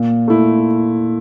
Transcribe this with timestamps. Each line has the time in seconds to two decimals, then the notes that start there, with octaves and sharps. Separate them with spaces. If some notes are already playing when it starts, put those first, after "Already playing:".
Already playing: A#2
0.28 A3 E4